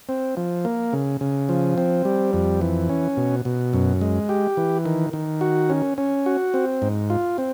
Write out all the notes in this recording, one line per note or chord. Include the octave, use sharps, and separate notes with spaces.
C4
F3
A#3
C#3
C#3
F3
C4
G3
F2
E3
C#4
B2
B2
F#2
G#3
G4
E3
D#3
D#3
F#4
C#4
C#4
F#4
C4
G#2
F4
C4